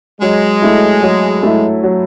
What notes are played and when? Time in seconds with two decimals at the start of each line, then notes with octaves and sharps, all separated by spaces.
0.21 F#3 G#3
0.62 A3 E4
1.02 F#3
1.43 A3 E4
1.83 F#3